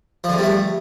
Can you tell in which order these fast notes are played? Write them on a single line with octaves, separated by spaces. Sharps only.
F3 D3 E2 G3 A3